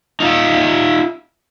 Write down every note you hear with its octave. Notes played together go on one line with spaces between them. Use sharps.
D#4 F4 E5